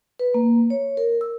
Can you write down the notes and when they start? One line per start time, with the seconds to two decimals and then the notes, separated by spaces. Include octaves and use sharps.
0.19 B4
0.34 A#3
0.70 C#5
0.97 A#4
1.21 E6